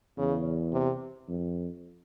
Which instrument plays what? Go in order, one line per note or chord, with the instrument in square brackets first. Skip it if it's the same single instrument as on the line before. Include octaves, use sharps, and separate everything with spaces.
[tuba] E2 [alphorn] C#3
[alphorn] C3
[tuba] F2